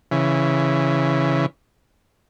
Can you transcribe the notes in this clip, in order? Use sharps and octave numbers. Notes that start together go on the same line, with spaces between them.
C#3 E3